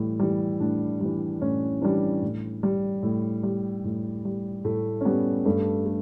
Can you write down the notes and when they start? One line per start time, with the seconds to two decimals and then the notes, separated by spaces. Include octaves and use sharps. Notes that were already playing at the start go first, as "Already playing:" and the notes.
Already playing: A2 E3 G3
0.20 E3 G3
0.60 A2 D4
1.00 E3 G3
1.41 A2 C#4
1.82 E3 G3 D4
2.22 A2
2.63 G3
3.03 A2
3.43 G3
3.84 A2
4.25 G3
4.64 A2 A3
5.01 C#4
5.05 G3 B3
5.45 G2 A3
5.86 A3